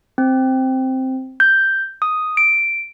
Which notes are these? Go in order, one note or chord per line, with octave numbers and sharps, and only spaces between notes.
C4
G6
D#6
D7